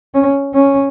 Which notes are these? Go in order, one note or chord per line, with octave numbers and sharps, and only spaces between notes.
C#4
C#4